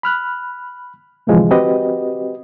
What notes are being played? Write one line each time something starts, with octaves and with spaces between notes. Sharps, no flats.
B5 F6 F#6
D2 G#2 C3 E3 F3 G#3
C4 F#4 G4 B4 D#5